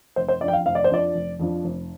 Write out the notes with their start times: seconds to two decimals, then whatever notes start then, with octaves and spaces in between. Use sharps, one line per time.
0.16 F1 C5
0.28 C5
0.41 F2 F3 D4 D5
0.48 G5
0.53 F5
0.65 F1 F5
0.75 D5
0.84 C5
0.90 F2 F3 D4 D5
1.15 F1
1.40 F2 F3 D4 F4
1.64 F1